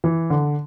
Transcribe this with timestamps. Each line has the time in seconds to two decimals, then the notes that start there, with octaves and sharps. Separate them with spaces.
0.04 E3
0.30 D3